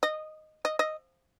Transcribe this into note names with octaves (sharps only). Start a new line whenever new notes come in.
D#5
D#5
D#5